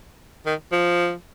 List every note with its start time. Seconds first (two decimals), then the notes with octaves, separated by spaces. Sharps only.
0.46 D#3
0.72 F3